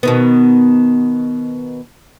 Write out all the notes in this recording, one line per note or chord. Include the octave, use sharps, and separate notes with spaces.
B2 D#3 B3